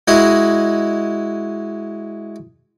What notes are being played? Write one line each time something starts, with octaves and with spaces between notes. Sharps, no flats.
G#3 E4 F#4 G#4 D#5